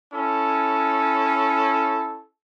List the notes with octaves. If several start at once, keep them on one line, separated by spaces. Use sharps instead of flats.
C#4 E4 A4